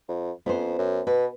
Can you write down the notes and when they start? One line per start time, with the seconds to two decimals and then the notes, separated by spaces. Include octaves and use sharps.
0.09 F2
0.46 F2 B3 C#4 C5
0.79 F#2
1.07 B2 B4